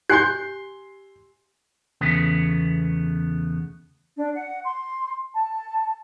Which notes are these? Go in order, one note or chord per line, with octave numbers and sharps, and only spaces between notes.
G4 G#5 C6 F#6 G6 C7
E2 C#3 A3 B3
D4
F#5
C6
A5